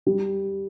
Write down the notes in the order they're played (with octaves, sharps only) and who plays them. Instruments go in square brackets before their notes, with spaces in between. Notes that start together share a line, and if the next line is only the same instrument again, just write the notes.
[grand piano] G3